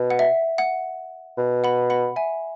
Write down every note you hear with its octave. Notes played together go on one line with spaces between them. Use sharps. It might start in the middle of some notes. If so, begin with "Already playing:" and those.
Already playing: B2
F#5
E5
F#5
B2
F#5 B5
F#5 B5
E5 G#5